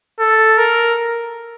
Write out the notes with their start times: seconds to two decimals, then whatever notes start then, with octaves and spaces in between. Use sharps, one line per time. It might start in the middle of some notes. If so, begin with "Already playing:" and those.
0.20 A4
0.58 A#4